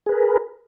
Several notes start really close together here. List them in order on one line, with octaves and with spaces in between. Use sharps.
G#4 B4 A#4